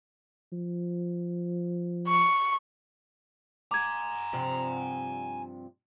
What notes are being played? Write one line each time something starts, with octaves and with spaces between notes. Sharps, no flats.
F3
C#6
G#5 A#5 D6 G#6
G2 C3 F3